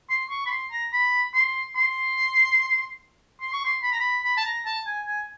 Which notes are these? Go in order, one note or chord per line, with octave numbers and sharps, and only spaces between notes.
C6
C#6
B5
C6
A#5
B5
C6
C6
C6
C#6
C6
B5
A#5
B5
B5
A5
A#5
A5
G#5
G#5